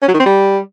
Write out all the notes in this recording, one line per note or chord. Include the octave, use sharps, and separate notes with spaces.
C#4
F#3
D#3
C4
G3